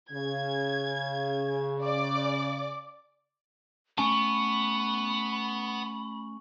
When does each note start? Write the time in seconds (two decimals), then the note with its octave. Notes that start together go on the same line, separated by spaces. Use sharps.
0.12 C#3 G#6
1.82 D5 D6
3.98 A3 B3 C#4 G#5 A5 B5 C#6